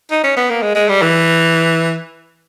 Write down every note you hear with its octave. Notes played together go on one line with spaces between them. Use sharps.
D#4
C#4
B3
A#3
G#3
G#3
G3
E3